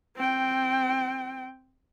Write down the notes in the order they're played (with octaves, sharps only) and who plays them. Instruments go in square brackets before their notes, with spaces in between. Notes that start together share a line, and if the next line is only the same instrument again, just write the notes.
[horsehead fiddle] C4 G5